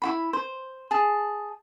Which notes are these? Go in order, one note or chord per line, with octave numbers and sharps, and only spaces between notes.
E4 F#4 B5
C5
G#4 A5